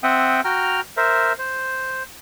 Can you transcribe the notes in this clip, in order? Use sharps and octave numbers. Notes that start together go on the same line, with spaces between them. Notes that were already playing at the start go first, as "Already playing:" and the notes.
C4 E5 F#5 G5 D#6
F#4 G5 A#5 F6
A#4 C5 E5
C5